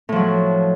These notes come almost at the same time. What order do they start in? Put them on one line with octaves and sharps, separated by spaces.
A2 F3 F#3